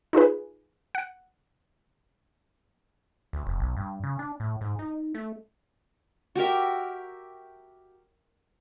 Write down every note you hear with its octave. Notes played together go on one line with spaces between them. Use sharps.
D#4 F4 G#4 B4
F#5
D2
F1
B1
G2
C#3
D4
A2
G#2
D#4
A3
F#4 G4 A#4 E5